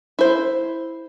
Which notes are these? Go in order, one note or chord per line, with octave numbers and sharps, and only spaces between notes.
E4 C5